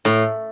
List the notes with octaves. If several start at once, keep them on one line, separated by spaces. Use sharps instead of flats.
A2